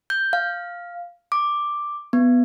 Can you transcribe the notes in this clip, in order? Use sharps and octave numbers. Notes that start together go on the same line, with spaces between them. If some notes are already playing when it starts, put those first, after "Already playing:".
G6
F5
D6
B3